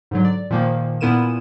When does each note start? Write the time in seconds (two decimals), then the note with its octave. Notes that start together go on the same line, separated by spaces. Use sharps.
0.11 G#2 D3 F#3
0.25 D5
0.50 A#2 D#3 F3 A#3
1.01 A#2 B3 E4 A#4 D#7 E7